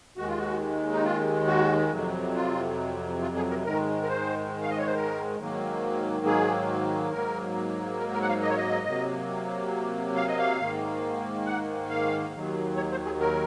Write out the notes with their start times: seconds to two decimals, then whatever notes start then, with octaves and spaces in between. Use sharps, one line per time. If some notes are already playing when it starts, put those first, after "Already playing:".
0.17 D#2 D#3 G#3 F#4
0.28 F4
0.38 F#4
0.93 D#4
1.04 F4
1.47 F#4
1.91 F2 C3 F#3
2.35 F4
3.22 F4
3.36 G#4
3.50 A#4
3.65 G#2 D#3 G#3 A#4
4.03 A#4
4.09 C5
4.62 F5
4.70 D#5
4.78 C#5
4.86 C5
4.95 A#4
5.39 G#2 D#3 F#3 A#3
6.26 G#4
7.12 G#2 F#3 A#3 A#4
8.00 A#4
8.13 A#4
8.22 F#5
8.29 F5
8.42 D#5
8.50 C#5
8.57 D#5
8.87 C3 F#3 A#3
10.16 F5
10.28 D#5
10.39 F5
10.60 G#2 D#3 A#3
11.46 F#5
11.90 F5
12.34 D#2 D#3 F#3
12.76 C#5
12.92 C5
13.05 G#4
13.20 A#4